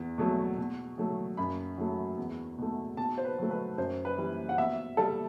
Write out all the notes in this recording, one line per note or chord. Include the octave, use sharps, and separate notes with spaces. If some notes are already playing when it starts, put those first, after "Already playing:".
Already playing: E2
B2 F#3 A3
B2
F#3 A3
F#2 B5
F#3 A3
E2
B2 A3
B2 A5
C5
B4
F#3 A3
B4
F#2 C5
B4
E3 G3
F#5
B2 E5
G3 A4